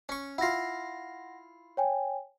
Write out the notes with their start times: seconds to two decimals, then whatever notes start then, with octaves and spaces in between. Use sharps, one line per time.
0.09 C#4 C#6
0.38 E4 F4 F#5 A#6
1.77 C#5 G5 G#5